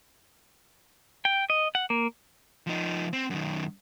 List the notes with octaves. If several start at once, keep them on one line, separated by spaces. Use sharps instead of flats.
G5
D#5
F#5
A#3
F3 D#4
C4
F#2 D#3